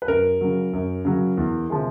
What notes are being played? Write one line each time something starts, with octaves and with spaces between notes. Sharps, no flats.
B4
F#2 A#4
C#3 F#3
F#2
C#3 F#3
E2
C3 F3 G#3